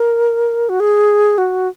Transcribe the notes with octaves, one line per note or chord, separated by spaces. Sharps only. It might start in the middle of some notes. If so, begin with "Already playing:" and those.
Already playing: A#4
F#4
G#4
F#4